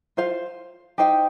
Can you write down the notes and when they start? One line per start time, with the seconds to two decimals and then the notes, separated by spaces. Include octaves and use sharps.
0.17 F4 C5 F5
0.98 D#4 G4 C5 G5